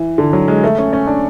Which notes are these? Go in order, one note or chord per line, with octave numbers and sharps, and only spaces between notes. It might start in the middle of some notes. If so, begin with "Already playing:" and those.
Already playing: E3
D3
F#3
G#3
A3
C#4
C#4
D4